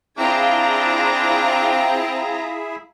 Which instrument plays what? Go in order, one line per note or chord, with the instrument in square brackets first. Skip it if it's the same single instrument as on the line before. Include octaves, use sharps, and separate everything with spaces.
[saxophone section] C4 [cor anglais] D4 [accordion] E4 G#4 E5 [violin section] F4 A#5